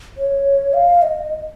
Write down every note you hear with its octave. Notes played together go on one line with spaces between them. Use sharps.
C#5
F5
D#5